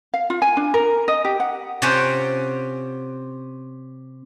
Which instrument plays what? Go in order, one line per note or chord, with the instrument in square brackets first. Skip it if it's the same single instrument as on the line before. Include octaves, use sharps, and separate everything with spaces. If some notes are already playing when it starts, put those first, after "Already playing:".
[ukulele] F5
F4
G#5
D4
A#4
D#5
G4
F#5
[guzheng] C3 C#4 F4 F#5 G5